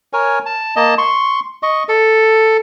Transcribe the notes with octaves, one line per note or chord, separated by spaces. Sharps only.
A#4 C#5 G#5
A5
A#3 D#5 A5
C6 C#6
D#5 C#6
A4